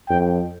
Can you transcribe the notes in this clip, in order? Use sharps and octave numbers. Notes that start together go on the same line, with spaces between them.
F2 G5